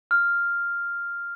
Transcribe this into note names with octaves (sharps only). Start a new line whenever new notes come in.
F6